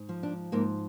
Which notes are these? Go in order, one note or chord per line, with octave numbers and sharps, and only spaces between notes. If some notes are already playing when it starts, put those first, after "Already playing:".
Already playing: G#2
F3
D4
G#2 A#3